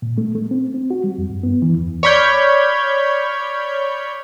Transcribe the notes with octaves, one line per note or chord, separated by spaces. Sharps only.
A#2
A3
A3
C4
C4
F#4
G3
F2
G2
B3
E3
E2
C#5 D5 B5 F6 G6 G#6